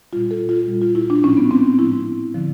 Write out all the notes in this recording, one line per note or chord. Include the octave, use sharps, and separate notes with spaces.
A#2 G3 F4
A4
F4
A#2 G3
F4
E4
D4
A2 F3 G#3 C#4
B3
C4
A2 F3 G#3 E4
D3 F3